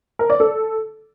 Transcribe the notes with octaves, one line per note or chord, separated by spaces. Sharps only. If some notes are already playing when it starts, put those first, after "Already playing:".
A#4
D5
A4